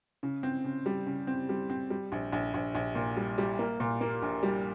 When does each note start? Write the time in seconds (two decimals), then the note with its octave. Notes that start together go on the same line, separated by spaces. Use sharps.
0.23 C#3
0.43 C4
0.64 C#3
0.86 G3
1.07 C#3
1.27 C4
1.49 G3
1.70 C4
1.90 G3
2.12 A#1
2.33 A#1
2.54 A#1
2.75 A#1
2.95 A#2
3.17 G3
3.38 G3
3.59 A#3
3.80 A#2
4.01 A#3
4.22 A#1
4.43 G3